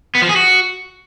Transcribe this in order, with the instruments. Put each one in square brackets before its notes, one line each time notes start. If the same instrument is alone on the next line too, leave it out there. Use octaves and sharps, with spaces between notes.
[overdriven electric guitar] B3
F3
G#4
F#4